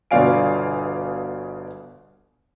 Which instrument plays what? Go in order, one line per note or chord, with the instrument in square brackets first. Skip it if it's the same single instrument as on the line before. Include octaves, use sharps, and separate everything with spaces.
[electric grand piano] G1 B2 D5 F5 G#5 D7